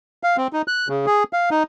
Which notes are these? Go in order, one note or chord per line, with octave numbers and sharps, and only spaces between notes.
F5
C4
D#4
F#6
C#3
G#4
F5
D#4